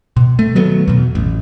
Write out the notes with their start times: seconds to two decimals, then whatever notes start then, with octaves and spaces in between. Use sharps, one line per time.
0.17 B2
0.39 A3
0.55 D#3 F#3 A3 B3
0.88 E2 B2
1.15 A1